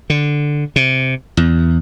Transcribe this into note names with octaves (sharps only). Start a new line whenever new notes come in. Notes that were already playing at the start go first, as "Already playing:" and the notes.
D3
C3
E2